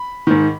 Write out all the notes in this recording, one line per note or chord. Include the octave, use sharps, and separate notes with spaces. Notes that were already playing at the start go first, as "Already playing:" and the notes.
Already playing: B5
G#2 D#3